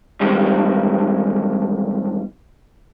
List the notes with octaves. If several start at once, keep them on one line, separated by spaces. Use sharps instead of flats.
E2 G#2 D#3 G3 C4